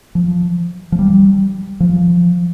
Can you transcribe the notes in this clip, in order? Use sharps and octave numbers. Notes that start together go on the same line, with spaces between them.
F3
F3
G3
F3